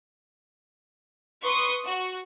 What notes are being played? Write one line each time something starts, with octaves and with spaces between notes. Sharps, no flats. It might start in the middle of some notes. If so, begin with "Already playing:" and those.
B4 C6 C#6 D#6
F#4